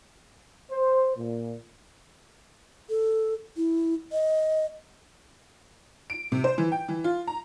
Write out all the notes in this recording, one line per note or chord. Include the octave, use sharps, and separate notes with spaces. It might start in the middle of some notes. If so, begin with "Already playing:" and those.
C5
A#2
A4
E4
D#5
D7
C3
C5
E3
G5
E3
F4
A#5